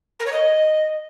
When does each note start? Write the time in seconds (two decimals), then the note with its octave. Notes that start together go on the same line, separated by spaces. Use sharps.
0.19 A#4
0.25 C#5
0.32 D#5